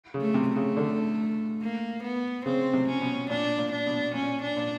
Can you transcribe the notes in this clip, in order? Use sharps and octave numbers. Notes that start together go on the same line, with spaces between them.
C#3
A3
C3
A3
C#3
D3
A#3
B3
C#3 C4
C3
C#4
B2
A#2 D4
A#2
D4
B2
A#2 C#4
D4
A#2